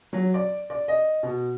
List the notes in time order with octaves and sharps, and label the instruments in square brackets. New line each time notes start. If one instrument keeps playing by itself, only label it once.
[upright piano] F#3
D5
D5
D#5
B2